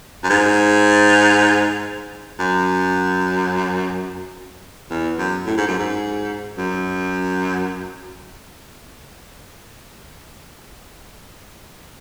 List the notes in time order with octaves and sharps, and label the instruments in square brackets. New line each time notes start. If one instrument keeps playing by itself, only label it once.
[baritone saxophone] F#2
G#2
F#2
E2
F#2
A2
G#2
F#2
G#2
F#2